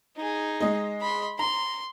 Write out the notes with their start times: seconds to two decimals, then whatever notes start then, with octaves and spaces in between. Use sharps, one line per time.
0.17 D#4 G#4
0.61 G#3 D#5
1.00 B5 C6
1.39 A#5 C6